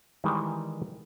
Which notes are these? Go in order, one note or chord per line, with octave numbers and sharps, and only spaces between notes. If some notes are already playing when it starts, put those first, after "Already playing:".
D#3 E3 G3 G#3